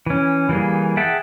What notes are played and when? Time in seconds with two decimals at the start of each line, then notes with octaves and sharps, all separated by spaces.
0.06 E3 C#4
0.49 E3 G3 A#3 G#4
0.97 G#4 E5 F#5 G5 A5